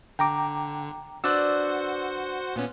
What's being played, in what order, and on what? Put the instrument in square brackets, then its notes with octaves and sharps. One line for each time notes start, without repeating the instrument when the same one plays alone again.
[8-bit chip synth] D3 [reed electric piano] G5 A#5 D6
[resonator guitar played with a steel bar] D4 B4 D5 [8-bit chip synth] F#4 C5 F#5 [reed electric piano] E6 F#6
[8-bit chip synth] A#2 B3 C#4